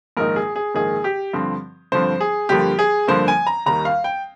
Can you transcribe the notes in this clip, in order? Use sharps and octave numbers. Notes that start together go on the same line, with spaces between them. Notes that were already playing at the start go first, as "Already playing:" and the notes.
A#1 G#2 D#3 A#3 D#4 A#4
G#4
G#4
A#1 G#2 D#3 A#3 D#4 G#4
G4
G2 D3 F3 C4
G2 D3 F3 C4 C5
G#4
G2 D3 F3 A#3 G4
G#4
G2 D3 F3 A#3 C5
G#5
A#5
D#2 D#3 G3 A#5
F5
G5